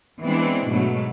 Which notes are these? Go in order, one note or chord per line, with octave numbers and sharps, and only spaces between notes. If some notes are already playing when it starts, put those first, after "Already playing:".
E3 G#3 B3 C4 D4 E4
G#2 B2 F#3 A3